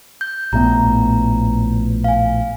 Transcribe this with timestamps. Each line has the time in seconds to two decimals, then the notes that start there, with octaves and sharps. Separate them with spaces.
0.21 G6
0.53 A#1 A2 B3 A#5
2.04 F5 G#5